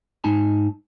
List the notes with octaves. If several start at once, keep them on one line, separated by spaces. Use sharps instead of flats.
G#2 D#4 G#5 A5